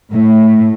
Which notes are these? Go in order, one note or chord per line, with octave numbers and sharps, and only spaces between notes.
A2